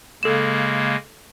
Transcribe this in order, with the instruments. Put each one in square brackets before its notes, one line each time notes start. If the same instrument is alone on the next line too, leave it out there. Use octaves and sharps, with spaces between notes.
[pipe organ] C#3 G#3 A#3 [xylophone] A4 E7